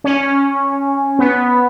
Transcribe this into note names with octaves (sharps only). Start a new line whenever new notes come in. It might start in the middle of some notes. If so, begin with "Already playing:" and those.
C#4
B3